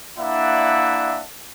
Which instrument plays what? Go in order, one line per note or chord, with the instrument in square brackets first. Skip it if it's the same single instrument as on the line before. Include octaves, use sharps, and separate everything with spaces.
[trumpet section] A#3 D4 E4 D5 E5 F#5